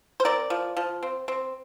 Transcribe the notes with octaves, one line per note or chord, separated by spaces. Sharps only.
C5
C4 A#4 D5
F3
F3
C4
C4